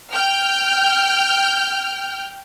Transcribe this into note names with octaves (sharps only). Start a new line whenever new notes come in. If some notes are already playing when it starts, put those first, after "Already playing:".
G5 F6 G6